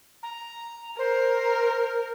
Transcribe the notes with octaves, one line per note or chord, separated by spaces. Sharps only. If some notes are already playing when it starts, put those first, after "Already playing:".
A#5
A#4 C5